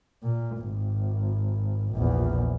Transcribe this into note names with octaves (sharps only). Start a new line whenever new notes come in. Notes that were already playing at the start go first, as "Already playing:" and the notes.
A#2
G#1
A#1 E2